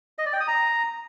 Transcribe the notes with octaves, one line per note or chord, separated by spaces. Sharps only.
D#5
D5
G5
D#6
A#5